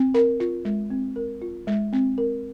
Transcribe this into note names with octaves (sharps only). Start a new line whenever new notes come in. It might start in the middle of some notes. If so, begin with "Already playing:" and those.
Already playing: C4
A#4
F4
G#3
C4
A#4
F4
G#3
C4
A#4